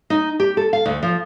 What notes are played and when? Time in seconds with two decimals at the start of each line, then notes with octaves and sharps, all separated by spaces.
0.10 D#4
0.40 G4
0.57 A4
0.73 F5
0.86 D2
1.03 F3